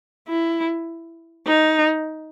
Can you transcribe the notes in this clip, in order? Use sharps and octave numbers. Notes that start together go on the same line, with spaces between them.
E4
D#4